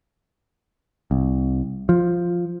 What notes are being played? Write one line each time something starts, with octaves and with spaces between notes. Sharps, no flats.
C2
F3